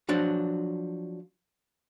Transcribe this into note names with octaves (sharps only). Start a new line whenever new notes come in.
F3 F#3 D4